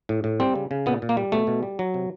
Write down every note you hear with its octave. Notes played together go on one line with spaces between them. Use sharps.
A2
A2
G3 C4
C#3
C#3
A#2 B3
A#2
A#3
G3
B2 A3
B2
G3
F#3
C3